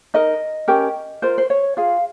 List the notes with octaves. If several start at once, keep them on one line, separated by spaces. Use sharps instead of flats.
D#4 A#4 D#5
C#4 G4 A#4
F4 A#4 C5
C5
C#5
F4 G#4 F5